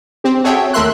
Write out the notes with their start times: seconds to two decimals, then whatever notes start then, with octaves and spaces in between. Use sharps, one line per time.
0.24 C4 G4
0.44 F#4 G#4 A4 C#5 E5 G5
0.73 D#2 A3 A#4 E5 C6 F#6